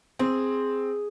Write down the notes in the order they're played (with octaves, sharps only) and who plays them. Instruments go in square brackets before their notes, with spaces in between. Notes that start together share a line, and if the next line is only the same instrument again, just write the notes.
[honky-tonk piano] C4 [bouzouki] G#4